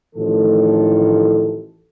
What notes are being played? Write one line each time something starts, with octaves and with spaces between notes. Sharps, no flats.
A1 A2 D#3 F3 A4